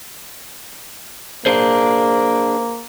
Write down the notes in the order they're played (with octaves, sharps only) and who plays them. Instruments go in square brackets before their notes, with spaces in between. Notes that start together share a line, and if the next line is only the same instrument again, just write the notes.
[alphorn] A#3 [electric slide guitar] D4 G#4 C5